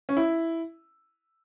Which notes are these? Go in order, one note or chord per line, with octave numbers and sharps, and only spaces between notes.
C#4
E4